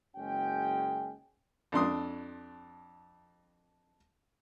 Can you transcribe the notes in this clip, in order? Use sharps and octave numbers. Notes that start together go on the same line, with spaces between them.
F#1 G#3 C#4 F#4 G5
F2 D4 C6 D#6